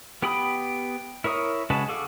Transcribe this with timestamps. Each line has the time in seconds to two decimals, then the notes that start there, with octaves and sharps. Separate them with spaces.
0.22 B3 G4 G5 B5 D#6
1.24 E4 A#4 C#5 D#6
1.70 C#3 G#3 F#4 B4 A5
1.88 F#4 G#4 A4 F5 D6